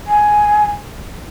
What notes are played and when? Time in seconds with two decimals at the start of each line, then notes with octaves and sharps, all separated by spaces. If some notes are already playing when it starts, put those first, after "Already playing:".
0.07 G#5